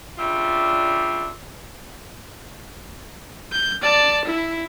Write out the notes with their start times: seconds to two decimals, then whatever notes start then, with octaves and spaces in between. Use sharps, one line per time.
0.18 C#3 G3 D4 F4 E5
3.52 G6
3.82 D5 A5
4.25 E4